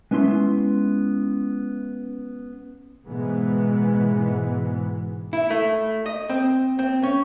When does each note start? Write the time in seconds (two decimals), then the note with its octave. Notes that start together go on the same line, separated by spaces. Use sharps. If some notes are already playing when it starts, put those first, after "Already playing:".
0.11 G#3 B3 C#4 E4 C6
3.05 G#2 B2 E3 G#3 B3
5.33 E4
5.50 A3
6.06 D#5
6.29 C4
6.79 C4
7.03 C#4